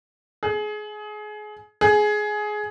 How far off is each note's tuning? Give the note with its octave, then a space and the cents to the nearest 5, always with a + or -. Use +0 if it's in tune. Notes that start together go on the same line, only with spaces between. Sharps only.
G#4 +25
G#4 +15